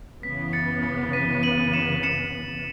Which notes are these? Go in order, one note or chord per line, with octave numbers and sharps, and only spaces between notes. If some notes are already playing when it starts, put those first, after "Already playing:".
F#2 C#3 E3 B3 B6
A6 C#7
A6 C#7
B6 D#7
D#7 F#7
C#7 E7
D#7
C#7 E7